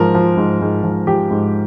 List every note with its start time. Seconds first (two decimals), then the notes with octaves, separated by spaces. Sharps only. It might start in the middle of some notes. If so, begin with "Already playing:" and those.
Already playing: G#2 F3 A#4
0.15 F3
0.37 G#2
0.61 G#2
0.83 F3
1.07 F3 G4
1.31 G#2